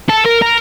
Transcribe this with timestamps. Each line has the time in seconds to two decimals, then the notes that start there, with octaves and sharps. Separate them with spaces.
0.10 A4
0.26 A#4
0.42 A#4